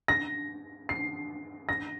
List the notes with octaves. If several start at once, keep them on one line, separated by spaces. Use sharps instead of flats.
A#6
C7
A#6